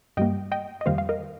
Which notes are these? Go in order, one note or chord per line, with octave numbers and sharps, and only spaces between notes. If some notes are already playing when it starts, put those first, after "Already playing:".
G2 G3 A#3 D#5 G5
D#5 G5
D#5
F2 D#3 G3 A#3 C5 F5
F5
A#4 D#5